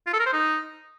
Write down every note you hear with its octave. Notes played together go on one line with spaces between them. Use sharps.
F4
A4
A#4
C5
D#4